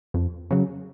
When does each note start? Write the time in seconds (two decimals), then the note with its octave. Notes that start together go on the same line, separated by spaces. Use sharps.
0.14 F2
0.51 C#3 F#3